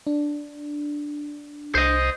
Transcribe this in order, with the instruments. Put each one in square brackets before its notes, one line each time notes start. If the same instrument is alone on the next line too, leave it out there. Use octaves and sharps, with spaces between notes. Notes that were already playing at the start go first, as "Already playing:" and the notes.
[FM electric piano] D4
[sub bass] C2 [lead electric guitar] C5 D#5